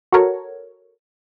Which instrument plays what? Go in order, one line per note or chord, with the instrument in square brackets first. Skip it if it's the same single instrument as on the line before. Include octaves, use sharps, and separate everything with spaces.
[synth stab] F#4 A4 A#4 C#5